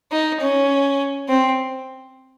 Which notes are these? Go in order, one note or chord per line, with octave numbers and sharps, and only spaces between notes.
D#4
C#4
C4